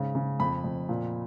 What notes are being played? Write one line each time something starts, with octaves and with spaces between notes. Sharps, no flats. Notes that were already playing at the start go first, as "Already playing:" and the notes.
Already playing: G#2 C#3
C#3
F2 B5
F2
A#2